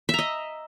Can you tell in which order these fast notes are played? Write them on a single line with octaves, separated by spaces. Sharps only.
E5 A#5 D#5